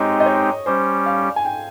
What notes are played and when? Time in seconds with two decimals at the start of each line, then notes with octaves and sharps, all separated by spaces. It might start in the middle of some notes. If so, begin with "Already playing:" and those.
Already playing: G#3 C4 D#4 G4 C#5 D#5
0.20 D#5
0.26 C#5
0.66 G3 C#4 G4 C5
1.06 F5
1.36 G#5
1.45 G5